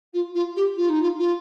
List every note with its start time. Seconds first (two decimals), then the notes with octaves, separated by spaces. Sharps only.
0.13 F4
0.35 F4
0.56 G4
0.77 F4
0.89 D#4
1.02 F4
1.18 F4